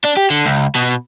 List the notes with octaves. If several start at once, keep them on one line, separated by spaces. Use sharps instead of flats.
D4
G4
D3
C#2
B2